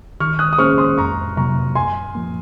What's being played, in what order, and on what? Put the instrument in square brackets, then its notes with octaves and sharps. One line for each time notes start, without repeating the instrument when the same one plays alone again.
[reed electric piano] D#3 [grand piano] C#6 F6
[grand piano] D#6 F#6
D#6
[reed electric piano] A#3 C#4 G#4 C5 [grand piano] C#6 F6
[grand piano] C6 D#6
[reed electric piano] F2 [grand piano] A#5 C#6
[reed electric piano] C3 F#3 A#3 [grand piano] A#5 C#6
[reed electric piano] F#2 [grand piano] G#5 C6
[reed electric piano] F3 A#3